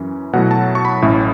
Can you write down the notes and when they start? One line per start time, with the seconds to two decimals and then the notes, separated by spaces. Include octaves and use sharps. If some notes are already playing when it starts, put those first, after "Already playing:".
Already playing: F#2 E3 C#4
0.33 B2 F#3 A3 E4 F#5
0.51 A5
0.75 C#6
0.85 B5
1.02 A1 A2 A3 C#4 E4